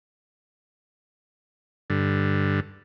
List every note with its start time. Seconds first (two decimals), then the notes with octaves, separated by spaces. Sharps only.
1.90 G2 D3